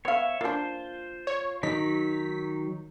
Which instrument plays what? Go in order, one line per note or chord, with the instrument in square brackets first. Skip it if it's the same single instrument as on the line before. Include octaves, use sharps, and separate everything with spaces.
[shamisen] B3 F5 [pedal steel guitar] C#5 E5
[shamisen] A#3 D4 [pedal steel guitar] F4 C5
[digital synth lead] C#5
[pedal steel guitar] D#3 F#3 D#4 [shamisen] D#5 [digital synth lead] B6